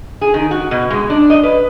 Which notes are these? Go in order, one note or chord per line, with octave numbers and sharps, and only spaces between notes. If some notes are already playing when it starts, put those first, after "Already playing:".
G#4
D#3
F#4
B2
G#3
D4
D#5
B4